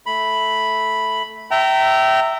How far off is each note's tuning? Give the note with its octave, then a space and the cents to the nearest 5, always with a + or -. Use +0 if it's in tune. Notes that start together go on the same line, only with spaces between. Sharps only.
A3 -10 B5 +0
E5 +0 G5 -25 A#5 -20